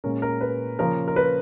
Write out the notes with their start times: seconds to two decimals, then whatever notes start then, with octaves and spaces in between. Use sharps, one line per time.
0.04 A#2 G#3 C#4 A#4
0.22 A#4
0.41 B4
0.79 C#3 F3 A#3 C#4 A#4
1.07 A#4
1.16 B4